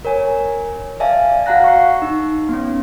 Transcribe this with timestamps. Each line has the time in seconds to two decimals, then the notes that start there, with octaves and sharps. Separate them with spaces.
0.05 A#4 C#5 G#5
1.00 D5 E5 F5 G#5 A5
1.46 F#4 F5 F#5 A#5 F#6 A#6
1.64 C#6 C7
2.02 D#4
2.49 B3 C#4